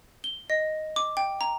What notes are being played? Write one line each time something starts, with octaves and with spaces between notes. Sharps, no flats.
G7
D#5
D6
G5
A#5